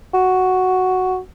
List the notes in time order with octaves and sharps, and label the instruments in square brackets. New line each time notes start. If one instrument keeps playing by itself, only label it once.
[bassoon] F#4